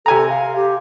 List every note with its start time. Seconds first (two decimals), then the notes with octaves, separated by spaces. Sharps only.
0.06 C3 A4 G#5 A#5
0.29 F5
0.56 G4